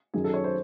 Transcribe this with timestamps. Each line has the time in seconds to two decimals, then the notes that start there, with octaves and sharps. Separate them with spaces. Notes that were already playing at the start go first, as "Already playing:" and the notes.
0.14 F#2 D#3 F#3 C#4 G#4
0.24 A4
0.34 C#5
0.44 C5